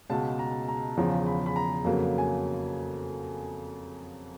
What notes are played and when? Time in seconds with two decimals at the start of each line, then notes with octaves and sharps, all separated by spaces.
0.10 C#2 B2 G#3 A5
0.39 A#5
0.68 A#5
0.97 E2 C#3 F3 A#5
1.26 B5
1.46 B5
1.56 A#5
1.84 F2 C#3 F#3 A#3
2.18 G#5